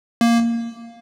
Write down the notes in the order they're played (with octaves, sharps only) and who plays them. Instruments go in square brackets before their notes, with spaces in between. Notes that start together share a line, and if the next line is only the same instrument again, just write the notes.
[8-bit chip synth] A#3